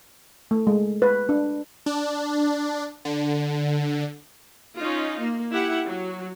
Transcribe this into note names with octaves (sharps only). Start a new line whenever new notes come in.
A3
G#3
B4
D4
D4
D3
C#4 D#4 F4
A#3
E4 G4 F#5
F#3